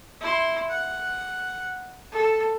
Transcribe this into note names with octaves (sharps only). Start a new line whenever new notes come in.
E4 C6
F#5
A4